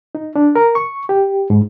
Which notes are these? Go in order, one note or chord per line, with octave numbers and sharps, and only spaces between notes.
D#4
D4
A#4
C#6
G4
G#2